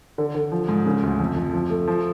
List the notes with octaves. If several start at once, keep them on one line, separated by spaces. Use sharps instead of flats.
D3
D3
F3
G#2
C#3
D2
F2
F2
F3
A3
F3